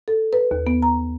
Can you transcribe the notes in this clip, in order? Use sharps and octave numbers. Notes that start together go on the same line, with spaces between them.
A4
B4
D#2
B3
A#5